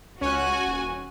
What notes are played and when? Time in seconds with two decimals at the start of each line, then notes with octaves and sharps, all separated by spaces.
0.21 C#2 C#4 F#4 G#5 F#6
0.66 D#1